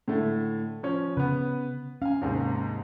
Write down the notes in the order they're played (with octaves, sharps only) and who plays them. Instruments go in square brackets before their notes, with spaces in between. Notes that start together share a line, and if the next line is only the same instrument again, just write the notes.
[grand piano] A2 D3 A3
F3 C#4
[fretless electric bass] C#3 [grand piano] B3 B4
[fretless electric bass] C#4 [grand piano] F5 G#5
[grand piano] D#2 G#2 C3